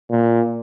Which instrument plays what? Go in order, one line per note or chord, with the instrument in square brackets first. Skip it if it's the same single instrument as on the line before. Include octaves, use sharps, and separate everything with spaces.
[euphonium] A#2